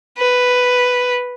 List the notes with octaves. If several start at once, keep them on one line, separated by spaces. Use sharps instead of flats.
B4